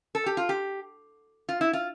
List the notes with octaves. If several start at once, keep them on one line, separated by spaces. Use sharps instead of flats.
A4
G4
F4
G4
F4
E4
F4